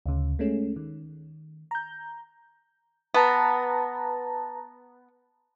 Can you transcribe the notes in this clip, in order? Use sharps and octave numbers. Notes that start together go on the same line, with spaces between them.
D2 C#3
G#3 A3 C#4
D#3
A#5 G6
B3 B4 A5 A#5